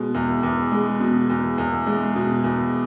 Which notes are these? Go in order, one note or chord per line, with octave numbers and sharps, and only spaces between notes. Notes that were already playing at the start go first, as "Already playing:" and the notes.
Already playing: B2 G#3
E2
E2
G#3
B2
E2
E2
G#3
B2
E2